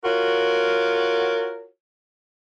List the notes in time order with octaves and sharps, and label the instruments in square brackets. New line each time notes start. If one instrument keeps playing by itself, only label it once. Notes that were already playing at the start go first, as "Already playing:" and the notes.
[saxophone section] F4 F#4 A#4 C#5